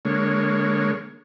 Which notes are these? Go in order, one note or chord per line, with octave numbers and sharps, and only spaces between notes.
D3 G#3 A#3 C#5